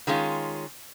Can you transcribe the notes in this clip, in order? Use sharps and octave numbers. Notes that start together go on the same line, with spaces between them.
D#3 G#3 C#4 F4